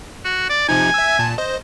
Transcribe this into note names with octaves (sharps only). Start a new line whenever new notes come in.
F#4
D5
C3 F3 D#4 G#5
E5 E6
A#2 A5
C5 D#5